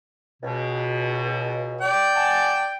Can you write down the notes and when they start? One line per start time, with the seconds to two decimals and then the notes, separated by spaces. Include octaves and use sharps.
0.43 C#2 B2
1.81 D5 G5
2.16 F#5 G#5 A5